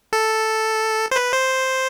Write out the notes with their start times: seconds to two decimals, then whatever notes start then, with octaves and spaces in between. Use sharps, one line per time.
0.13 A4
1.11 C5
1.16 B4
1.33 C5